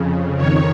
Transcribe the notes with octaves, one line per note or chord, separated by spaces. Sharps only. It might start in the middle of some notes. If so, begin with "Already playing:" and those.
Already playing: F2 C#3
F2 D#3 C#5